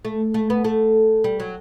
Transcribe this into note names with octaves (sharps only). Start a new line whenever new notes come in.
A3
A3
B3
A3
G3
F#3